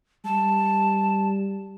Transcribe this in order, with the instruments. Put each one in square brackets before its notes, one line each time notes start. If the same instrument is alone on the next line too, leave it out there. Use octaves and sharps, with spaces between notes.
[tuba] G3 [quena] A5